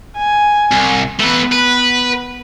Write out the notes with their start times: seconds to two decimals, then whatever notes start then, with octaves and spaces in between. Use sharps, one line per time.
0.17 G#5
0.71 C2
1.20 A3 B3 B4
1.52 B4